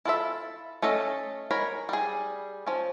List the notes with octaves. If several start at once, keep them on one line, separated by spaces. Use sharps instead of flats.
E4 F4 A4 E5
A3 C#4 A4 D#5
G#3 A#4 C#5 B5
G3 G#4
F3 C#4